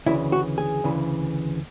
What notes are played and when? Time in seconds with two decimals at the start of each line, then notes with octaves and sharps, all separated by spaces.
0.06 D2 C#3 E3 E4
0.32 F#4
0.58 G#4
0.84 D2 C#3 E3